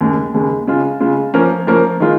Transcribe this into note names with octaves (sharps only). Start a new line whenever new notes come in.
D#2 C#3 G#3
D#2 C#3 G#3
C#3 G#3 F4
C#3 G#3 F4
F3 A#3 C#4 A#4
F3 A#3 C#4 A#4
D#3 G#3 F4